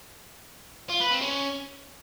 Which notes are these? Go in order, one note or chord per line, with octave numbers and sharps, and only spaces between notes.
F4
B4
C4
C#4